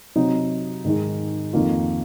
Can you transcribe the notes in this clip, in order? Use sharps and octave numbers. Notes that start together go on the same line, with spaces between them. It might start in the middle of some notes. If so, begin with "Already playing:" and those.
C3 F#3 C4 D#4
G#2 D#3 G#3 D#4
F2 D#3 A#3 F4